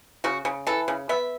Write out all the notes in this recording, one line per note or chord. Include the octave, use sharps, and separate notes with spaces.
C#3 F#4
C#3
E3 A4
C#3
B3 E5